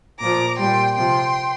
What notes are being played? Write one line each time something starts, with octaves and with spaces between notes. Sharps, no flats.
A#2 F3 A#5 D6
A#2 G3 G5 C6
C3 F3 G5 C6